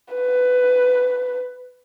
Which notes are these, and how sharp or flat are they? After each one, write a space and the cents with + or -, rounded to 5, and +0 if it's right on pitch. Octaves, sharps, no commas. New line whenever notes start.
B4 +15